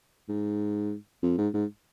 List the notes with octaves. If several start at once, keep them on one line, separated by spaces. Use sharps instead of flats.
G#2
F2
G#2
G#2